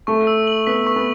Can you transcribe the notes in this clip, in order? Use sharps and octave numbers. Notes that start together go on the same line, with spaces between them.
A3 C#6
E6
F#7
B3 B6
C#6
B3